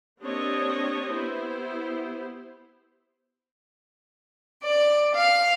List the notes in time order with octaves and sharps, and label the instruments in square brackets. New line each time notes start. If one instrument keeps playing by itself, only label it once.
[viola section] A#3 C4 D4 G4 C#5 D#5
B3 E4 G4 C5
[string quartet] D5
F5